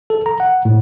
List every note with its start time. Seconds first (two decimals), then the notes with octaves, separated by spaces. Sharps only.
0.10 A4
0.26 A#5
0.40 F#5
0.65 A2